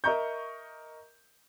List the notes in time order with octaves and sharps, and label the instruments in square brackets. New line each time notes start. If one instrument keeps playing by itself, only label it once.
[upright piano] A#4 D#5 E5 A#5 C#6 G6